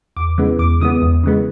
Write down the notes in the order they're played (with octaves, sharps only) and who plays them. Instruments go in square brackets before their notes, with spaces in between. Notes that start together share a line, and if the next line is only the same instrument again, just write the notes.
[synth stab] E2 D6
C#3 E3 G#3 B3
E2 D6
C#3 E3 G#3 B3 D#6
E2
C#3 E3 G#3 B3